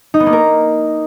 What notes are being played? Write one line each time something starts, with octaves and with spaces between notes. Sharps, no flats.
D#4
B3
A#3
A#4